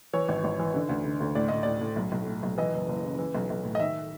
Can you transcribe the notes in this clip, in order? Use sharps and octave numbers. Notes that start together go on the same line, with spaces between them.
E3 C#5
G#1
G#1
E3
D3
D2
D3
D2
A2 D5
A2 D#5
A2 D5
A2
B1
B1
A2
B1
E3 D#5
F#1
F#1
C#3
E3
B1
B1
A2
D#5
D#3 E5